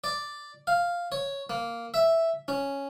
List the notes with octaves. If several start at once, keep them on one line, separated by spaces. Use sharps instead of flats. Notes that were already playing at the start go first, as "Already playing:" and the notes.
D5
F5
C#5
A#3
E5
C#4